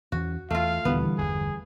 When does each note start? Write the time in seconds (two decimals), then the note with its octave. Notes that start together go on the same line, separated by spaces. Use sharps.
0.12 E2 E3 C#4 F#4
0.51 E2 A3 F4 F5
0.85 D#1 D2 B2 D3 E3 G3 B3
1.18 G1 E2 G#4